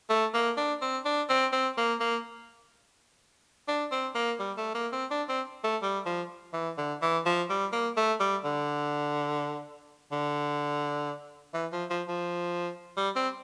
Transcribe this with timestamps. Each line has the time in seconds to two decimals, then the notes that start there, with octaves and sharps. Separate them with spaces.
0.10 A3
0.34 A#3
0.57 D4
0.82 C4
1.05 D4
1.29 C4
1.53 C4
1.78 A#3
2.00 A#3
3.68 D4
3.92 C4
4.15 A#3
4.40 G3
4.58 A3
4.75 A#3
4.93 C4
5.11 D4
5.29 C4
5.64 A3
5.83 G3
6.06 F3
6.53 E3
6.78 D3
7.02 E3
7.26 F3
7.50 G3
7.72 A#3
7.97 A3
8.20 G3
8.44 D3
10.12 D3
11.54 E3
11.72 F3
11.90 F3
12.08 F3
12.97 G3
13.16 C4